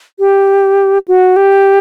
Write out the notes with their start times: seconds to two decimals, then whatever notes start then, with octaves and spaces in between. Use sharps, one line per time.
0.19 G4
1.08 F#4
1.36 G4